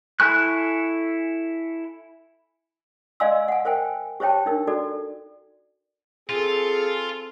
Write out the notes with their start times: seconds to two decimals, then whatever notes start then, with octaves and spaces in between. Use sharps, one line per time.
0.20 E4 A4 G#5 C#6 F#6
3.20 D5 D#5 F5 G#5 C6 E6
3.48 F#5 G#5
3.65 A#4 C5 G5 G#5
4.20 G4 C5 C#5 G5 A5
4.46 D4 D#4 A#4
4.67 F#4 A4 D5
6.29 C4 F4 G#4 A4